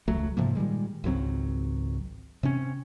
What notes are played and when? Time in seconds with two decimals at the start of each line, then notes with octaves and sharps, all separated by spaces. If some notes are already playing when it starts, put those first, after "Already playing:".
0.08 E1 C#2 F#3 A3
0.37 G#2 C3 F3 A#3
0.55 A#2 D#3 G3 G#3
1.04 G#1 C#2 F#3 C4
2.43 C3 C4 C#4